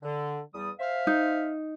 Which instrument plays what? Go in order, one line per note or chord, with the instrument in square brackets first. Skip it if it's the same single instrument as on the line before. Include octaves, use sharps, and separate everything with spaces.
[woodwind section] D3
E2 G3 D#6
C5 E5 F5
[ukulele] D#4